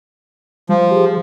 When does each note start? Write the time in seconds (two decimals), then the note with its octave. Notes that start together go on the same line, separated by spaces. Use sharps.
0.69 F3 G3
0.91 G4 G#4